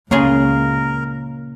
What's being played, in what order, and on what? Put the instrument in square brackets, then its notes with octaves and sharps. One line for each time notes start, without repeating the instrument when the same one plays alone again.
[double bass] C#2 [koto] C#3 F4 G#4 [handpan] A#3 [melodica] A#4